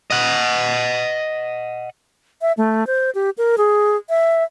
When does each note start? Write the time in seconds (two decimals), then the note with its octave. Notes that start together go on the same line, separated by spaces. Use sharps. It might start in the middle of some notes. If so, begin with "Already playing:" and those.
0.11 D#5 F#5
2.42 E5
2.57 A3
2.87 C5
3.15 G4
3.38 A#4
3.58 G#4
4.09 E5